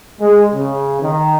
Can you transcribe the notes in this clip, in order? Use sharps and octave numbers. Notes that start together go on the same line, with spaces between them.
G#3
C#3
D#3